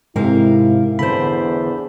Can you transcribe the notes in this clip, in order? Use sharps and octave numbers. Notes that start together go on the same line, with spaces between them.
G#2 C3 E4 A#4 F5
E2 D3 C5 B5